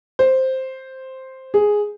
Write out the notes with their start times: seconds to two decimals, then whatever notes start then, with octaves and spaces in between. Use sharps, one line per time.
0.19 C5
1.54 G#4